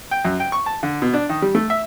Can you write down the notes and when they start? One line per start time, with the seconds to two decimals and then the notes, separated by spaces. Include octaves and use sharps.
0.11 G5
0.25 F#2
0.40 G5
0.52 C#6
0.66 A5
0.83 D3
1.02 B2
1.13 D4
1.29 D#3
1.42 G3
1.55 A3
1.70 E5